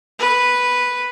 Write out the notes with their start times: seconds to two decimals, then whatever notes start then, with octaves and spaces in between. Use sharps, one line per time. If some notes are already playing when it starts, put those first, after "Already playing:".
0.19 B4